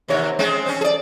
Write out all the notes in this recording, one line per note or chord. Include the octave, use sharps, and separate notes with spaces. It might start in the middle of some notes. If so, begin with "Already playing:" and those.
D#2 C3 C#5
G#3 C4 C#4
C4 C#4
G#4 D5